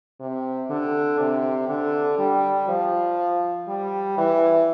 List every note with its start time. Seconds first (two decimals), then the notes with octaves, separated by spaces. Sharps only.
0.20 C3
0.70 D3
1.19 C3
1.69 D3
2.19 G3
2.68 F3
3.68 G3
4.18 E3